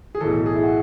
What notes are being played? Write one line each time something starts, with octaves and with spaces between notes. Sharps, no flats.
G#4
B1 A2 E3 A4
G#4
E4
F#4